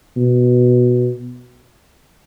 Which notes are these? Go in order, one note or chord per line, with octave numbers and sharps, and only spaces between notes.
B2